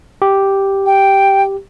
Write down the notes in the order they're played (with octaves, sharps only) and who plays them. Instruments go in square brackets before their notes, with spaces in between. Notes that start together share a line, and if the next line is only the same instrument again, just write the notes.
[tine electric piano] G4
[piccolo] G5